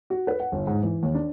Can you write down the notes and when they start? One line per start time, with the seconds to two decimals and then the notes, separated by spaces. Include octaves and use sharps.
0.10 F#4
0.27 B4
0.40 F#5
0.52 G1
0.67 G#2
0.83 E3
1.03 D#2
1.14 D4